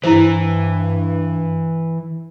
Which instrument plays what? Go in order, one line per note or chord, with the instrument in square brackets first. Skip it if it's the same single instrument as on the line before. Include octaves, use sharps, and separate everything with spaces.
[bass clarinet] G2 [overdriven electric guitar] E3 [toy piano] E4 C5